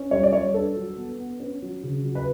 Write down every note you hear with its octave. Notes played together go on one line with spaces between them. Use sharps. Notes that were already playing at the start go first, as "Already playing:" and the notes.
Already playing: C#4
G3 C#5
D5
G3 C#5
D4 A4
F#3
B3
B3
C#4
F#3
C#3
F#3
B4